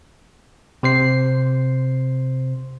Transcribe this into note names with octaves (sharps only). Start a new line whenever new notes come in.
C3 C5 C7